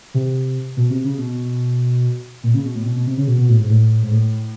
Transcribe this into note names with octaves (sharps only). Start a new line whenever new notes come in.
C3
B2
C3
C#3
B2
A#2
C#3
B2
A2
B2
B2
C3
C#3
B2
B2
A2
G#2
A2
G#2
A2